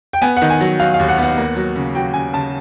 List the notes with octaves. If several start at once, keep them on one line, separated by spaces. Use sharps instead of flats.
G5
B3 G#5
F#5
D#3
G#5
F#3
F#3 F5
F5
D#2
F#5
B3
F#5
A#3
F#3
C#3
F#3 G5
C#3 G#5
C#3 A5